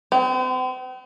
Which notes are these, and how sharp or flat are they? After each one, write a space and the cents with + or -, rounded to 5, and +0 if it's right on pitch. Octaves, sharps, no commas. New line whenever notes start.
C4 -45